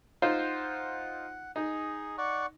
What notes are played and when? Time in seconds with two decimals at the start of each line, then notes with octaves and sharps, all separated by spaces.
0.22 D#4 F4 C5 F#5
1.56 D#4 G#4
2.18 D5 F#5 C#6